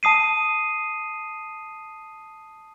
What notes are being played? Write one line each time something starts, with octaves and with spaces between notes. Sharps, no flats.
A5 D#6 C7 D#7